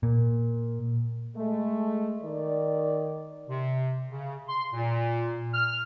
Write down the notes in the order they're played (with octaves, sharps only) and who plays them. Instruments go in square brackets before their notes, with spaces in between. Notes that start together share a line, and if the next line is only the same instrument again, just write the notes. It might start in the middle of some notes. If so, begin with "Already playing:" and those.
[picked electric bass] A#2
[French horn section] G#3 A3
D#3 D5
[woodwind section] C3
C#3
C6
A#2
F6